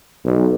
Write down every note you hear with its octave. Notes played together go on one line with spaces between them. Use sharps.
B1